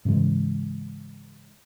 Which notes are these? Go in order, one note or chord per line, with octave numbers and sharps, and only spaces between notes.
G#2 C#3 E3 G#3